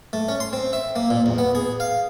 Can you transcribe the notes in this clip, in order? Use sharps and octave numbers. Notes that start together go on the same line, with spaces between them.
A3
C#4
C6
C4
E5
A#3
A#2
E2
B3
G#4
F5